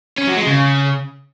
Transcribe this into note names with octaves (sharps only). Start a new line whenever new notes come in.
C#4
F#3
G#3
C#3